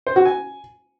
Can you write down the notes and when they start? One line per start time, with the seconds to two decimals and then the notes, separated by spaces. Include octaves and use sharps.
0.07 C5
0.16 F#4
0.25 G#5